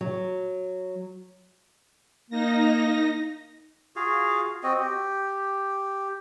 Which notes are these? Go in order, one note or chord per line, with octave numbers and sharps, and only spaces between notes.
F#3
A#3 D#4 A#6
F4 F#4 G#4 F5
C4 F#4 D#5
G4